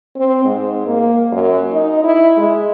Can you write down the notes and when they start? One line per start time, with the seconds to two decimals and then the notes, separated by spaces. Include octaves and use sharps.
0.16 C4
0.45 G#2
0.86 A#3
1.32 F#2
1.72 D#4
2.04 E4
2.37 G#3